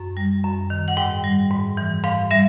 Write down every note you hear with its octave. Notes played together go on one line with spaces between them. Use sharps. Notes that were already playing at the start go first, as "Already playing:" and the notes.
Already playing: F#2
G3
F#2
D#3
F#5
G#2 G5
G3
G#2
E3
G#2 F5
G3 E5